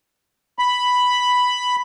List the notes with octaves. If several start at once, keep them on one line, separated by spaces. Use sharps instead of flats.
B5